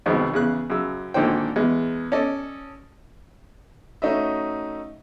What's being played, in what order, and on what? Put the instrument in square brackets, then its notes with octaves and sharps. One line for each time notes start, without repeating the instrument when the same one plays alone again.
[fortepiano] C2 F2 B2 D#3 G#3
E2 C#3 F#6
F#2 C#3 E6
G#1 A#2 D3 D#4 C5 G5
E2 G#3
C#4 A4 D5 D#5
[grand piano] A3 C#4 D#4 F#4 D#5 E5